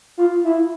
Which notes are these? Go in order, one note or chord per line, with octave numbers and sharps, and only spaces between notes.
F4
E4